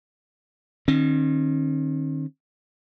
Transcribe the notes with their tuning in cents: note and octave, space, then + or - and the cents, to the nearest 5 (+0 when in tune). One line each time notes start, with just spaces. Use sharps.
D#3 -25 C4 +45